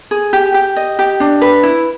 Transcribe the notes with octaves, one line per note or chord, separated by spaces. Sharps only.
G#4
G4
G4
D#5
G4
D4
B4
E4